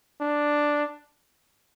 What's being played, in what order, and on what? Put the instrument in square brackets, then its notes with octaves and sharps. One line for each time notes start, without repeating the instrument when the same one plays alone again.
[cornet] D4